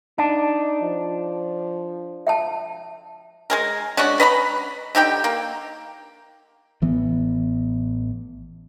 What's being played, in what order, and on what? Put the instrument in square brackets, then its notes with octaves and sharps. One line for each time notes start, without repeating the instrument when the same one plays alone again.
[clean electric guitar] D4 [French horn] D#4 [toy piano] A5
[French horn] F3
[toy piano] E5 G5 A5
[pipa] G#3 G#4 A#4
G#3 C#4 D4 F#4
B4 D#5 A#5 B5
D3 D#4 G4 G5
A#3
[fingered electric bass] A1 E3 B3